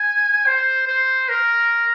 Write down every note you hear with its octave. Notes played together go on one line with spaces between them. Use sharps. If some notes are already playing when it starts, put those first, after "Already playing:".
Already playing: G#5
C5
C5
A#4